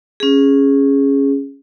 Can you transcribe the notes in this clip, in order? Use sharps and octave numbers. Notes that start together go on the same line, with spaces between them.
C#4 G#4